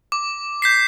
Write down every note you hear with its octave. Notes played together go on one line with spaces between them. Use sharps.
D6
G6 B6 C7